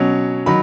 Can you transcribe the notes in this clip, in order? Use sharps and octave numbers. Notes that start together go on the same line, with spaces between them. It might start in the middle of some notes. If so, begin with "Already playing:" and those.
Already playing: B2 F#3 C#4
D#3 F#3 B5